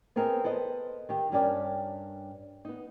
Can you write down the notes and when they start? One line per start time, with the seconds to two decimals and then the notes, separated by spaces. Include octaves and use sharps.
0.16 B3 C4 G#4 A#4 C5 D#5
0.44 A4 B4 C5 D#5
1.09 D#3 D#4 G4
1.32 G2 C#4 G4 A#4 D5 G5
2.65 B3 D#4